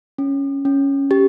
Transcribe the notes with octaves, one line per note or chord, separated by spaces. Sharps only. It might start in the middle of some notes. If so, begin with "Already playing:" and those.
C#4
C#4
G4